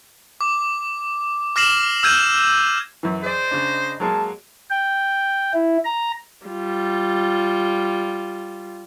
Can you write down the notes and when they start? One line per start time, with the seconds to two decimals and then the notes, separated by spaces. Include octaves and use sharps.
0.41 D6
1.56 D6 F6 A#6 C7 E7 F#7
2.03 E6 F6 G6 G#6 D#7
3.03 F#2 E3
3.23 G#4 C5 D5 D#5
3.51 C#3 D4
4.00 F#3 G#3 A#3 A5
4.70 G5
5.54 E4
5.85 A#5
6.46 G3 F4